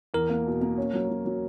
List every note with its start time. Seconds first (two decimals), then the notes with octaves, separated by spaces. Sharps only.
0.14 E2 A#4
0.30 A#3
0.46 B2
0.61 A#3
0.78 C#4
0.94 F#3
1.09 F#3
1.25 F#3